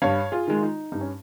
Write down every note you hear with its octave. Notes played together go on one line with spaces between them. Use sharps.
G2 C#5 F5
F4 G#4
D#3 G#3
F4
D#4
G2 D#4
C#4